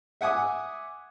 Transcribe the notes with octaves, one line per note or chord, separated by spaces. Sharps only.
E5 F#5 G#5 D6 D#6